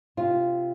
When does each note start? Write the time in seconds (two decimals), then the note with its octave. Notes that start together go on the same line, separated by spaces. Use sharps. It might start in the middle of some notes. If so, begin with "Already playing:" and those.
0.17 C3 F4